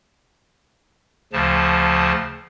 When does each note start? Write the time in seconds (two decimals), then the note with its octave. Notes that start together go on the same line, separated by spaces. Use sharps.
1.33 D2 C#3 F3 A5